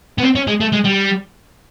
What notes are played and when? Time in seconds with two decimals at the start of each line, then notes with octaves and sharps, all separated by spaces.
0.18 B3
0.23 C4
0.35 C#4
0.47 G#3
0.60 A3
0.72 G#3
0.84 G3